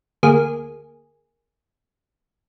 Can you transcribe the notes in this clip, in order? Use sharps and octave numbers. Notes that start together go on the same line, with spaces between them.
D2 A#3 G#4